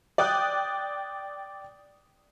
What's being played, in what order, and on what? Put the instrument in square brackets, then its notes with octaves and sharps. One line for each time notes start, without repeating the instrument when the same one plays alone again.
[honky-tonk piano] D5 G5 D#6 F#6